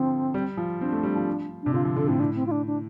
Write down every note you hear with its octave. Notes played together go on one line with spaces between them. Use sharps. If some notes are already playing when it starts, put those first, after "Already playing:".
Already playing: D3 F3 C4
G3
F3
C4 D4
A3
G3
F3
C3 D4
D3 F4
F3
D3 A4
A2 C4
A2 D4
C4
F4
D4
D4